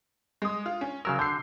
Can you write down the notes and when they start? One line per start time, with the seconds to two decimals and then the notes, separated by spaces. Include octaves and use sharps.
0.42 G#3 D#6
0.66 F4
0.81 C#4
1.05 C#3 F#3 A#4 E6
1.19 D3 G6 C7